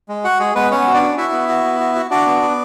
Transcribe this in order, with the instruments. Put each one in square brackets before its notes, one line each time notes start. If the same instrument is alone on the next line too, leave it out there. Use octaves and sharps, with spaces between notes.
[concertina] G#3
F#4 F#5
G#3 G#4
G#3 B3 B4
B3 C#4 C#5
F#4
D4 D5
F#4
E4 F#4 E5
B3
F#4
B3
F#4
F#4
D4 F#4 D5
B3
B3